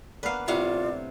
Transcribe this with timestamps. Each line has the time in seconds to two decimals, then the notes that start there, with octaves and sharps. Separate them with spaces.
0.23 A#3 B3 D4 B4 F5
0.48 A2 C3 G3 F4 D5 F5 F#5